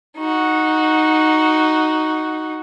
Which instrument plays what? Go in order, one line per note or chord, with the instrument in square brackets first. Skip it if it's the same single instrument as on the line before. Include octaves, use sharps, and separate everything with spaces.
[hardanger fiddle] D#4 F#4